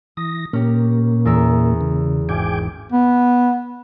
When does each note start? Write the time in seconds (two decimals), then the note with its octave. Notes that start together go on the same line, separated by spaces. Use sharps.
0.17 E3 D#6 A#6
0.53 A#2 A#3 C#4 G4
1.25 E2 A#4 E6
1.81 C#3
2.29 G#1 G5 G#5 D6
2.92 B3